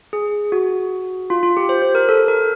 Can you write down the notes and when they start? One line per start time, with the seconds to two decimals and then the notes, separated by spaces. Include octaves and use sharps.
0.13 G#4
0.52 F#4
1.30 F4
1.43 F4
1.57 G4
1.69 C5
1.82 C5
1.95 A#4
2.09 A4
2.28 A#4